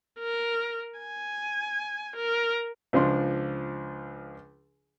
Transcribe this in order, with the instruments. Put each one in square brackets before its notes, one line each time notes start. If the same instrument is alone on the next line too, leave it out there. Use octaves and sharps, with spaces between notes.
[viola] A#4
G#5
A#4
[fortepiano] C#2 F3 D4 C6